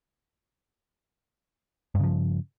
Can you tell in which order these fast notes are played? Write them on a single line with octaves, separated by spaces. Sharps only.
G2 C#3 F3